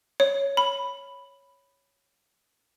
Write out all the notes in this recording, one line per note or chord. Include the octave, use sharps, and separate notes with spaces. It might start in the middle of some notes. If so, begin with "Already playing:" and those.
C#5
B5